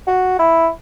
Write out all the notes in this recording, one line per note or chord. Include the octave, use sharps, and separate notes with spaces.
F#4
E4